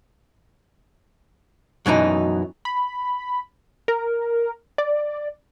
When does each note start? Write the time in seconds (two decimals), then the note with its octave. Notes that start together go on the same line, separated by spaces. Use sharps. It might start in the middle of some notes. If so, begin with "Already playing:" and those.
1.86 F#2 B2 E3 D#4
2.65 B5
3.88 A#4
4.78 D5